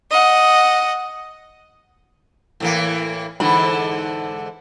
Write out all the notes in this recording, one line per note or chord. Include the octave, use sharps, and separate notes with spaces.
D#5 F#5
A2 E3 A#3
G#2 D3 E3 B5